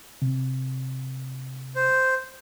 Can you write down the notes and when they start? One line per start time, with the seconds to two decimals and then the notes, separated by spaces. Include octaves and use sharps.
0.22 C3
1.76 C5